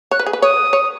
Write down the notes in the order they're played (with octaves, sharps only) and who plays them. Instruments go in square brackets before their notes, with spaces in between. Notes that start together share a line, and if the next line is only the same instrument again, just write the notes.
[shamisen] C#5 [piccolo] F#6
[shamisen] B4
G#4
B4
[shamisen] C#5 [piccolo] D#6
[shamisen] C#5